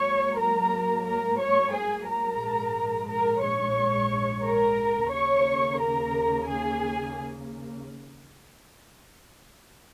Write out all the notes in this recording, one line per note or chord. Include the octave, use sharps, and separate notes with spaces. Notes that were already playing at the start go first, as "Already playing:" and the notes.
Already playing: G#2 F#3 A#3 C#5 C#6
A#4 A#5
A#4 A#5
C#5 C#6
G#4 G#5
A#4 A#5
A#1 G#2 G#3
A#4 A#5
C#5 C#6
A#4 A#5
D#2 C#3 A#3 C#5 C#6
A#4 A#5
G#4 G#5